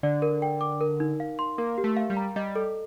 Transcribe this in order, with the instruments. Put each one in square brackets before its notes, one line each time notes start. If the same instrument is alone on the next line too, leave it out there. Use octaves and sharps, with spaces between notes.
[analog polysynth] D3 [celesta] D5
[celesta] A#4
G5
D6
A#4
D#4
F5
C6
[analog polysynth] A#3 [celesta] A#4
[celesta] G4
[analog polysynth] A3
[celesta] F5
[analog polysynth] G3
[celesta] A#5
[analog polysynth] G3 [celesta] D#5
[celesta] A4